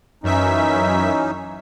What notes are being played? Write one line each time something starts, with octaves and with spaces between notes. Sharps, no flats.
F#2 E3 C#4 D#4 E5 B6